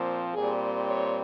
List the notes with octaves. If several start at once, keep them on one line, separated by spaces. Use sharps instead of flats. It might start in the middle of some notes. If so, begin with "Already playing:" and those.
Already playing: A#2 F3 C4
A#2 G3 C4 G#4
C#5